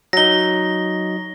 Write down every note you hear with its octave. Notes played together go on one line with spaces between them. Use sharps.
F#3 D#4 A#6 G7